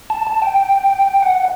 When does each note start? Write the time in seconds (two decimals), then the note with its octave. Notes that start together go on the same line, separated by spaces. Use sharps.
0.10 A5
0.27 A5
0.42 G5
1.23 F#5